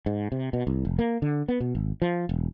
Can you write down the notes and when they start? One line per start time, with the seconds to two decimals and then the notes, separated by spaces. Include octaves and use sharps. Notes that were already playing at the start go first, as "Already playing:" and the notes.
0.06 G#2
0.32 C3
0.53 B2
0.67 C2
0.85 F1
0.99 A#3
1.22 D3
1.48 B3
1.60 B2
1.75 G#1
2.02 F3
2.29 E1